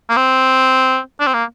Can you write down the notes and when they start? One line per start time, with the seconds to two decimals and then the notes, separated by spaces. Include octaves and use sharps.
0.09 A#3
0.17 C4
1.20 D4
1.27 C4
1.34 A#3